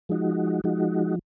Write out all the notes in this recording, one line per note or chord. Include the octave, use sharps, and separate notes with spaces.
F3 G#3 D#4 F#4
F3 G#3 D#4 F#4